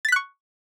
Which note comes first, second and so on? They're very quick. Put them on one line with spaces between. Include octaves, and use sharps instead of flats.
A6 B6 F#6 C#6